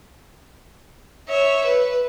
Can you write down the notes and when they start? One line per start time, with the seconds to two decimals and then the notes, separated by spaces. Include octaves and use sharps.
1.29 C#5 E5
1.65 B4